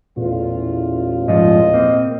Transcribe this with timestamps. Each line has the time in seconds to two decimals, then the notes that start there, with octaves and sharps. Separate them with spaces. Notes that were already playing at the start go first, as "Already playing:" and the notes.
0.17 A1 E2 A#2 F4
1.28 G#2 F3 D#5
1.74 A#3 C4